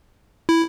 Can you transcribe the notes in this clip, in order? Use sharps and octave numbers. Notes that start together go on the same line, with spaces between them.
E4